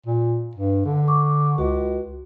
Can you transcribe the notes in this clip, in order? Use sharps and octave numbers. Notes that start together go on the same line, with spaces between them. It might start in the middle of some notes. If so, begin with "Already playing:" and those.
A#2
G2
D3
C#6 D6
C#2 F#4